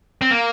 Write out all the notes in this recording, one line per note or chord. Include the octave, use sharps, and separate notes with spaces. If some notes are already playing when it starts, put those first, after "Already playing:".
C4
A#3